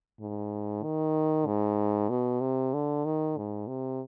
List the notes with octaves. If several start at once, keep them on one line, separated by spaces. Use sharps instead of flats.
G#2
D#3
G#2
B2
C3
D3
D#3
G#2
C3